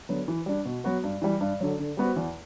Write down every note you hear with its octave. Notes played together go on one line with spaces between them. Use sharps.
D3 F#3 B3
E3
G3 D4
B2
F#3 B3 F#4 B4
G2
E3 G3
G2
D3 F#3
D3
G3 B3 F#4 C5
E2